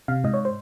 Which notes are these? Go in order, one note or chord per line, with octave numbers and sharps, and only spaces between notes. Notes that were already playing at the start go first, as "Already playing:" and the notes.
C3 F5
G#2 D#5
C#5
C5